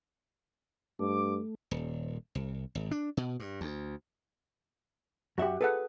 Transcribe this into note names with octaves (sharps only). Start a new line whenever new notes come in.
G2 A3 D6
D#1
C2
G#1
D4
B2
G2
D2
F#2 F#4 G4 E5 F#5
G#4 A4 B4 F#5